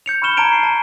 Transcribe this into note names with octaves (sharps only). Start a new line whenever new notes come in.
G6 C#7 F7
B5 C#6 F6 E7 G7
A5 A#5 G#6 D7 E7 F7
C7
A5